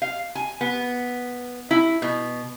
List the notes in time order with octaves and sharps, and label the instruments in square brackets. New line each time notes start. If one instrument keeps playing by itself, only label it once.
[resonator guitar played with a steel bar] F5
G#5
B3
E4
B2